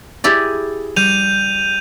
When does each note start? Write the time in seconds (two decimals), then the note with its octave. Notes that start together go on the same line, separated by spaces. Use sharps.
0.24 E4 G4 G#4 D5
0.96 G3 G6 D#7 F7